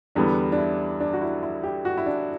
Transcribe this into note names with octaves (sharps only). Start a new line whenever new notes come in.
E2 D3 G3 B3 D4
D4
E4
D4
F#4
E4
E4
G4
F#4
E4
D4